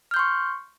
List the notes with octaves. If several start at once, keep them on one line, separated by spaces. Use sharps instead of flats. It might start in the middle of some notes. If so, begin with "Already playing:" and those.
C6 C#6 F6 G6